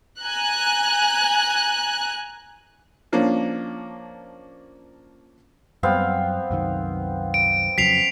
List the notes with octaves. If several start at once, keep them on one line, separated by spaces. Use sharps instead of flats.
G#5 A#5 F#6
F3 A#3 C#4 D4
F#2 G3 B3 C4 F5
C2 F#2 D#3
D7
F2 C#3 F#3 B6 C7 F7